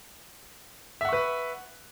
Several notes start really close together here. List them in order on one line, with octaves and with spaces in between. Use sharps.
E5 F#5 C#6 B4